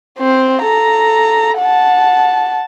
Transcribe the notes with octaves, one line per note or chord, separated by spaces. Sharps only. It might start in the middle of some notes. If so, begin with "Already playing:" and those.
C4 C5
A4 A#5
F#5 A5